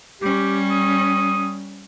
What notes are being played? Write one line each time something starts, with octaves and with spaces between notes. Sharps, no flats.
G3 C#4 G4
D#6